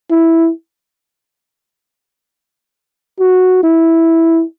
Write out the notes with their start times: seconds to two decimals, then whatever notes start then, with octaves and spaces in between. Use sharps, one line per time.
0.10 E4
3.20 F#4
3.63 E4